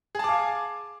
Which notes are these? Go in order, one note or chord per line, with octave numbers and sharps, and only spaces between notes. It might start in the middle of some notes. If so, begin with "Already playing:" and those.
G#4 F5 G#5 A5 D6